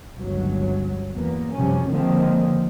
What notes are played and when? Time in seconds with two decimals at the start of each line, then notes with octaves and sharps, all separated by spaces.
0.18 G1 C#2 F#3
1.14 E2 A#3 B3
1.53 F#2 C3 F3 G3 C#4
1.87 D3 D#3 F3 G#3 A#3 C4